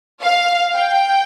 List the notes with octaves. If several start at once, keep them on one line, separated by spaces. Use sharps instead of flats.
F5
G5